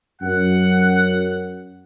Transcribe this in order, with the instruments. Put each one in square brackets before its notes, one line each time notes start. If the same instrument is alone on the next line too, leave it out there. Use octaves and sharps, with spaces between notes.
[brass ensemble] F#2 [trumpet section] F#5